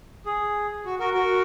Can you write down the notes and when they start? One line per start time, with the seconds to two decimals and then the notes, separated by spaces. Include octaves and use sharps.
0.26 G#4
0.85 F#4
0.99 F#4 A#4
1.14 F#4 A#4